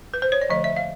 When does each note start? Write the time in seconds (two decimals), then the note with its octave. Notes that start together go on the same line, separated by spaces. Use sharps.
0.14 B4
0.22 C5
0.32 C#5
0.42 D5
0.49 D3 F3 A3 D#5
0.64 E5
0.76 F5